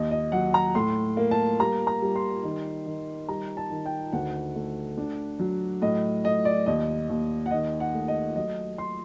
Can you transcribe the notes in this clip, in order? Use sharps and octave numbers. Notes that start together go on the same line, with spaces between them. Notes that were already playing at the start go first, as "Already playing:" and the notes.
Already playing: D#2 D#5
D#5
F#3 F#5
A#5
A2 C6
A#3
A5
G3 A#5
A#5
G3
C6
D#3
D#3
G3 A#5
A5
D#3
G5
D2 F#5
A3
D4
F#3
A2 D#5
A2 D#5
D5
D#2 D#5
D#2
F#5
D#3 D#5
F#5
A3
D#5
F#3 D#5
F#3 C6